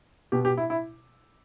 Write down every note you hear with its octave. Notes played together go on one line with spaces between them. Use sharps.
B2 G4
G4
E4
E4